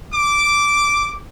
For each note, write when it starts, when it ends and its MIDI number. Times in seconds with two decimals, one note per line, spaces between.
0.13 1.20 86